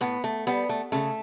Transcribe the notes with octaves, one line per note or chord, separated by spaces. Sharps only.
A2 B3
A3
G3 B3
A3
C#3 A3